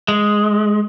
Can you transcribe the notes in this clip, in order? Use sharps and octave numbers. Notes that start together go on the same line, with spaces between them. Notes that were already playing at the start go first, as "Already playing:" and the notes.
G#3